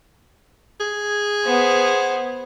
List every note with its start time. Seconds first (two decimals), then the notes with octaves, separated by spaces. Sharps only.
0.80 G#4
1.45 B3 C5